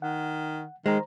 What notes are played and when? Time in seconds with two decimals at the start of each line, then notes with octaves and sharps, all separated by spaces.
0.02 D#3 F#5
0.86 D#3 G#3 C5 A#5